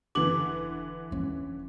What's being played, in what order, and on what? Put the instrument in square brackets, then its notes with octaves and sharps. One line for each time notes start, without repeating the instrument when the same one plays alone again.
[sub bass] E1 [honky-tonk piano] D3 E3 [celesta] D6 F#7
[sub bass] E1 [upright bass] F3 C#4